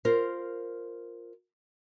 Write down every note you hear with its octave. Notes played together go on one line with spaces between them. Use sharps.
F4 A#4 C5